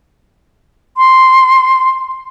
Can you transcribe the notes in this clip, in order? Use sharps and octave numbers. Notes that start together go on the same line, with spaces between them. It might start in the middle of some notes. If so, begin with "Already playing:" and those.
C6